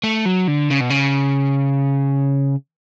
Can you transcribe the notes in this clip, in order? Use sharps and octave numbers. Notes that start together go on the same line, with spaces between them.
A3
F#3
D3
C#3
B2
C#3